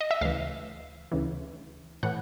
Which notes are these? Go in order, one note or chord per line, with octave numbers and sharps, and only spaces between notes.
D#5
E5
D2 C#3 E3 F5
D2 C#3 E3
A2 E3 F#5